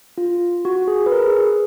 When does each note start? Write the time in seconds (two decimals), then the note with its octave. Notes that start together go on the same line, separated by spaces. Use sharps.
0.18 F4
0.65 F#4
0.88 G#4
1.06 B4
1.12 A#4
1.27 G#4